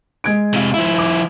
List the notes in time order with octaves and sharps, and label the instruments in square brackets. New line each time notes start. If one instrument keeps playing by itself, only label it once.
[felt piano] G#3 G#6 D7
[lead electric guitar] C3 F4
F3 E4
[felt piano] D6